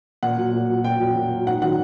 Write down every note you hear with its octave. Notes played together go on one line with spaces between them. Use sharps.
A#2 F#5
F#3
A#2
F#3
A#2 G5
F#3
A#2
F#3
G#2 F#5
D#3 F#3 F#5